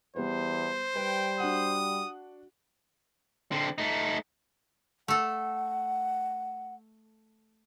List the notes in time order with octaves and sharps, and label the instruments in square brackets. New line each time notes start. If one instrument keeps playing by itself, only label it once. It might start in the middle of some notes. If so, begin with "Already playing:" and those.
[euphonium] E2 [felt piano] G3 B3 [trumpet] C5
[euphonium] G3 [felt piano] B4 [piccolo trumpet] G5
[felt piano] D4 F#4 F#5 [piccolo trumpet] D#6
[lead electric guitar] D3 C4
A3 D#4
[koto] A3 A4 [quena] F#5